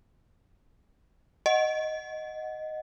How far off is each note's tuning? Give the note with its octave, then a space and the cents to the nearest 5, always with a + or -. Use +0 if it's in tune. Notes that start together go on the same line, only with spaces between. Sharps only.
D#5 +0 F#5 +0